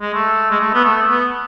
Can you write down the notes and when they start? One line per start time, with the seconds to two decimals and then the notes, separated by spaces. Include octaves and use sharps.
0.01 G#3
0.14 A3
0.50 G#3
0.60 A3
0.74 B3
0.85 A3
1.08 B3